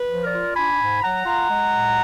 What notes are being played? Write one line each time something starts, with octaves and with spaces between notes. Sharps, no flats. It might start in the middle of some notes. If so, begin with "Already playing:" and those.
Already playing: B4
F3
A#4 D5
F4
D4 G#5 B5
G#2
F#3 F#5 A#5
F4
G#3
A#2